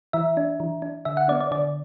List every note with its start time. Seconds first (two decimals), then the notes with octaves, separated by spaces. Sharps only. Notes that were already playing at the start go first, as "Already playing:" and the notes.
0.13 E3 E5
0.37 D4
0.60 E3
0.82 D4
1.05 D3 E5
1.17 F#5
1.28 B3 D4 D5
1.40 D5
1.51 D3 D5